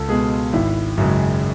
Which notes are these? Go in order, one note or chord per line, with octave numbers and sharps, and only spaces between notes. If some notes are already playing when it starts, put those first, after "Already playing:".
Already playing: C#2 A4
B2 G#3 G#4
G#1 E4
F#2 C#3 G#3